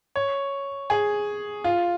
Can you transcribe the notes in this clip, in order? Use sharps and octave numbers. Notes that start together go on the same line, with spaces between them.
C#5
G#4
F4